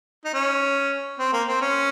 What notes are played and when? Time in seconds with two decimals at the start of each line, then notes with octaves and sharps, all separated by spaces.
0.25 D#4
0.34 C#4
1.19 C4
1.33 A#3
1.48 C4
1.61 C#4